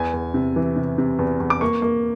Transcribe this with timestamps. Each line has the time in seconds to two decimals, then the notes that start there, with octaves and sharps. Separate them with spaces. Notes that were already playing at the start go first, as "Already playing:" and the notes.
Already playing: E2 G#5
0.13 E2
0.34 C3
0.56 E3
0.76 C3
0.98 C3
1.19 E2
1.40 E2
1.50 D6
1.61 A#3 C#6
1.82 A#3